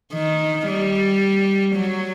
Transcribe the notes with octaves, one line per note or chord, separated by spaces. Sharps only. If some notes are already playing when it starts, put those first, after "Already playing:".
D#3
G3
F#3